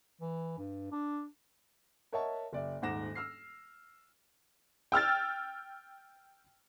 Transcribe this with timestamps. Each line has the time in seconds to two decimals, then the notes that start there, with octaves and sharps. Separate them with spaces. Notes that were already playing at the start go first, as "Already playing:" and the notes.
0.21 E3
0.58 G2
0.92 D4
2.12 A#4 C#5 D#5 E5 F#5 A5
2.53 F#1 D5 E5
2.82 D#1 G#2 F#5 D6 A#6 E7
3.15 E6 F6 C7
4.92 G5 E6 F6 A6